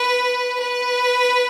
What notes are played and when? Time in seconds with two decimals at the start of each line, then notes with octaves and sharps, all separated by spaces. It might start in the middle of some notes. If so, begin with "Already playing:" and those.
Already playing: B4
0.61 B4